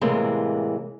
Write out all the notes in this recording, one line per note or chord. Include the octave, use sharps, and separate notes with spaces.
A2 C3 E3 G#3 A#3